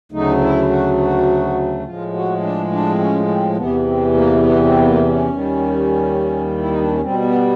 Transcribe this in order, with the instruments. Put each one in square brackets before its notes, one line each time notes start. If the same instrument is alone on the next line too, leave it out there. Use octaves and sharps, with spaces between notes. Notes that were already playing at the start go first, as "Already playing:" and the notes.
[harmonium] D2 C#3 F#3 A3 D#4
E4
F#4
F#4
F#4
A2 F3 G#3 F4
F#4
D4
D4
C4
C#4
C4
E2 C3 E3 B3
C4
A#3
B3
C4
B3
A#3
C#4
D#2 D#3 G3
E4
D#4
D4
C#4
B2 G3 C4
B3